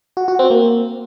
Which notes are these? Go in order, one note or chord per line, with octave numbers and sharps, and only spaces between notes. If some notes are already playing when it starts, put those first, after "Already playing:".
F#4
F#4
C4
A#3